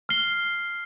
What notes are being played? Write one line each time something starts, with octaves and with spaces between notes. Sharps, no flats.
F6 C7 G7